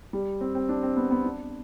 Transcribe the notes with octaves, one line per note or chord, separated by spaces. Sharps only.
G3
C4
C4
D4
C4
B3
B3
D4